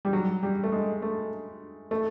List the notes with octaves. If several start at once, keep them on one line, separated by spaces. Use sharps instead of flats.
G3
F#3
G3
A3
G#3
A3
A3